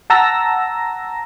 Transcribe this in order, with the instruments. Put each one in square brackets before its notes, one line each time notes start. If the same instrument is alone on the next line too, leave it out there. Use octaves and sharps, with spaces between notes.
[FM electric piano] F#5 A5 A#5 E6 A#6